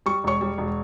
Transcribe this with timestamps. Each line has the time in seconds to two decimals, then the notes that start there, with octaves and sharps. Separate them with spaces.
0.06 G3 C#6
0.24 E1 C#5 C#6
0.41 G3
0.58 E1